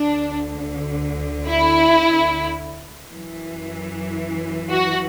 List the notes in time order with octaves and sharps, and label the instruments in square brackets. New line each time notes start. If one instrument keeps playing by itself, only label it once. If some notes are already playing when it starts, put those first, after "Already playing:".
Already playing: [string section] D2 D3 D4
E4
F#2 E3
F#4